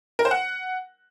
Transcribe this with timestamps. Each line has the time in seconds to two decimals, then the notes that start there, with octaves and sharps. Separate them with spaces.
0.19 A#4
0.25 C5
0.31 F#5